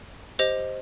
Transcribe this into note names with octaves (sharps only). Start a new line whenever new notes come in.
G4 C5 D#5